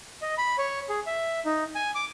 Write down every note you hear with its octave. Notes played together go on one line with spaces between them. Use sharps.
D#5
B5
C#5
G#4
E5
D#4
G#5
D6